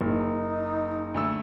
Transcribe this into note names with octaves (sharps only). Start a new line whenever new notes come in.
F#1 D#4
D2 A3 E6